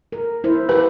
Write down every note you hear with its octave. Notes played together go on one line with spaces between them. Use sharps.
A#4
E4 C5
G4 B4